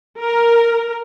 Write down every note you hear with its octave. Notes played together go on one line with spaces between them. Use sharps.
A#4